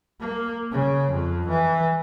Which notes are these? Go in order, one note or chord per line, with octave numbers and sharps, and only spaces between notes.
A#3
C#3
F2
E3